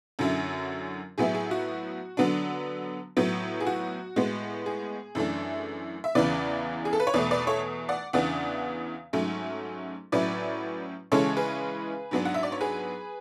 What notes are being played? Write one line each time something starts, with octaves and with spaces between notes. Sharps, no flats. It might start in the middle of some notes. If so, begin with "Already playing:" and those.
F#2 D3 F#3 C#4 E4
A2 F#3 B3 E4 G#4
G#4
F#4
D3 F#3 B3 D4
A2 F#3 B3
G#4
F#4
A2 G#3 B3
G#4
F#2 E3 A3 D4
E5
E2 C#3 E3 B3 B4 D5
G#4
A4
B4
C#5
E2 B2 A3 B4 D5
B4 D5
A4 C#5
D5 F#5
E2 C#3 E3 B3 D4 D5 F#5
G#2 F#3 A3 C#4
A2 F#3 C#4 E4 B4 D5
C#3 E3 G#3 C#4 A4 C#5
G#4 B4
G#2 F#3 B3 D4
F#5
E5
D5
C#5
G#4 B4